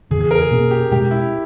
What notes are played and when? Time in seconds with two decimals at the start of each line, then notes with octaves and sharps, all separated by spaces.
0.10 E2 C#3 E3 G#4
0.21 G#4
0.31 A#4
0.41 G#4
0.51 B2 A#3 C#4
0.71 G4
0.91 B2 G#3 C#4 G4
1.11 E4